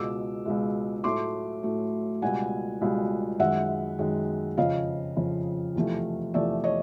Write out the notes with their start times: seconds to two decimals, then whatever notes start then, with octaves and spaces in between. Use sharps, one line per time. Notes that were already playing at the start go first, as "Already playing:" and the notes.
Already playing: C#2 B2 G#3 D6 E6
0.45 C#2 B2 G#3
1.04 A2 F#3 A3 C6 D6
1.63 A2 F#3 A3
2.22 C#2 B2 G3 F#5 G#5
2.81 C#2 B2 G3
3.40 F#2 D#3 G#3 E5 F#5
3.99 F#2 D#3 G#3
4.58 F2 C#3 F3 D#5 F5
5.16 F2 C#3 F3
5.75 E2 C3 F3 A3
6.34 E2 C3 F3 A3 D5 E5
6.64 C#5 D#5